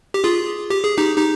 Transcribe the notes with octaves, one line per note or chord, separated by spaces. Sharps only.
G4
F4 G#4
G4
G#4
D#4 G4
D#4 G4